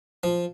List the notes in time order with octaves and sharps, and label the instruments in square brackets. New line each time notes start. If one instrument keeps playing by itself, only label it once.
[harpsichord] F3